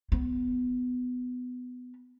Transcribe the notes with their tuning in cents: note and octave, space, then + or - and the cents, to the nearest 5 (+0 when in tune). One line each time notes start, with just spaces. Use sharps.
B3 +15